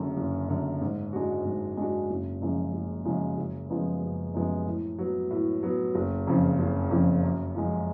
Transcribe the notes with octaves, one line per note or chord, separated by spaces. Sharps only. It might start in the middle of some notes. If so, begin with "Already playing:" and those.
Already playing: F#1 F#2 D3
F#1
F#2 D3
G#2
G#3 D4 F#4
G#2
G#3 D4 F#4
F#1
F#2 C#3 F3 G#3
F#1
F#2 C#3 F3 G#3
F#1
F#2 F3 G#3 B3
F#1
F#2 F3 G#3 B3
A2
F#3 B3
A2
F#3 B3
F#1
F2 C#3 F3
F#1
F2 C#3 F3
F#2
F3 G#3